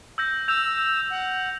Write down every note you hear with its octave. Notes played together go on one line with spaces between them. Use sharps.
E6 G6 A#6
E6 G6 F7
F#5